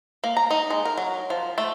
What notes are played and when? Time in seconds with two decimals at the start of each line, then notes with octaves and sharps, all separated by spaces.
0.24 A#3
0.37 A#5
0.51 D#4
0.70 G#3
0.85 A#4
0.98 F#3
1.30 F3
1.58 A3